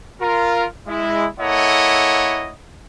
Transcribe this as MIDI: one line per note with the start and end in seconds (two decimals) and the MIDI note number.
0.20 0.66 65
0.20 0.66 70
0.87 1.26 56
0.87 1.26 64
1.40 2.53 58
1.40 2.53 64
1.40 2.53 69
1.40 2.53 73
1.40 2.53 75
1.40 2.53 78